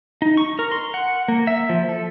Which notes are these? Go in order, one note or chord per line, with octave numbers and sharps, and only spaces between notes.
D#4
C#6
A#4
C6
F#5
A#3
E5
F3
A4